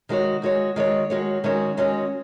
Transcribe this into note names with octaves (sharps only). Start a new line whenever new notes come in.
D#3 G#3 F#4 C#5
D#3 G#3 F#4 C#5
D#3 G#3 F#4 C#5
D#3 G#3 F#4 C#5
D#3 G#3 C#4 F#4 C#5
D#3 G#3 C#4 F#4 C#5